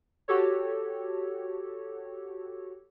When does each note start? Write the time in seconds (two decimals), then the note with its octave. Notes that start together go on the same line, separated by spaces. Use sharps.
0.28 F#4 G4 A4 C#5